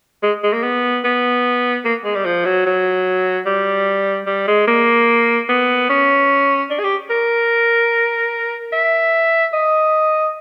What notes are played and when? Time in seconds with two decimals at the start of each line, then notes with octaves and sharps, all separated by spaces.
0.23 G#3
0.44 G#3
0.53 A#3
0.63 B3
1.04 B3
1.85 A#3
2.04 G#3
2.15 G3
2.25 F3
2.45 F#3
2.66 F#3
3.46 G3
4.27 G3
4.47 G#3
4.67 A#3
5.49 B3
5.89 C#4
6.70 D4
6.79 G#4
6.84 G4
7.10 A#4
8.72 E5
9.53 D#5